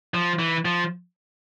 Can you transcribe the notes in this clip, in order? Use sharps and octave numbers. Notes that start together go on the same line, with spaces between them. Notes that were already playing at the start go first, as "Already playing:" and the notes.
F3
E3
F3